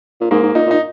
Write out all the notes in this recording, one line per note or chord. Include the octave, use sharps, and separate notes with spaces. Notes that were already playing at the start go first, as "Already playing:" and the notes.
A#2
G#2 A#3
G#2
A#2 D#4
A#2 D#4